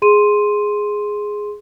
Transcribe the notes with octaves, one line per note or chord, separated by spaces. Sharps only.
G#4 C6 D#7